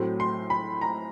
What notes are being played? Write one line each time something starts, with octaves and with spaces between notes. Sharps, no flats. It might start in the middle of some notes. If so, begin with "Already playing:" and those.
Already playing: A2 F#3 A3 C4
C6
B5
A#5